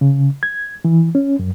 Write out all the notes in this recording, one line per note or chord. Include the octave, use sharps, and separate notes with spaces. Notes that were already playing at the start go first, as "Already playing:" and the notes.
C#3
G#6
E3
C#4
F#2